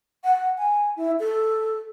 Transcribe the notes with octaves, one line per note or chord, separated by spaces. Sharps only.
F#5
G#5
E4
A4